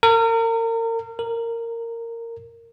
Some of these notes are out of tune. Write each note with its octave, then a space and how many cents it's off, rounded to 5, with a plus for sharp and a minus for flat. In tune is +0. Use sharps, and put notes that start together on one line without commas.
A#4 -35
A#4 -15